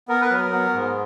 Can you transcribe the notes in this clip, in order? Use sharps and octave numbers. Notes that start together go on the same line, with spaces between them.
B3 A#4
B4
F#3 A#4
B3
G#2